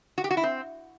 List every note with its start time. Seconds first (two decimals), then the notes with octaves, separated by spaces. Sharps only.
0.18 F#4
0.24 G4
0.31 F#4
0.37 E4
0.43 C4